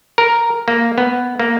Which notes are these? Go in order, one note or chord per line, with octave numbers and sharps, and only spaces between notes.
A#4
A#3
B3
A#3